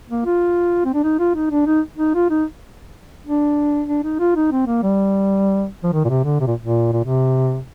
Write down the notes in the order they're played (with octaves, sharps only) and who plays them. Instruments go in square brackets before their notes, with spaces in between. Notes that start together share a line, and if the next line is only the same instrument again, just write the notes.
[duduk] A#3
F4
C4
D4
D#4
F4
D#4
D4
D#4
D#4
F4
D#4
D4
D4
D#4
F4
D#4
C4
A#3
G3
F3
D#3
A#2
C3
D3
C3
A#2
A#2
A#2
C3